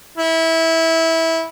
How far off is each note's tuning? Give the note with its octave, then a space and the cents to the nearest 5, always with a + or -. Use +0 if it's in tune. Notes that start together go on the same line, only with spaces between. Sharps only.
E4 -15